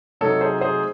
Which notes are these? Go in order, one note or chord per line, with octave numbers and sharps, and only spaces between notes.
C3 F#3 A3 D#4 A4 C#5
G#4 C5
G#4 C5